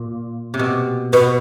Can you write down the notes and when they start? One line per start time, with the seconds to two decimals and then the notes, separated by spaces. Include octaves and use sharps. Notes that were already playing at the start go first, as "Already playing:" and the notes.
Already playing: A#2
0.54 C3
0.59 B2
1.13 B2 B4